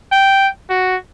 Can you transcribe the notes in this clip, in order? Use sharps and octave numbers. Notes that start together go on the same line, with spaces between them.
G5
F#4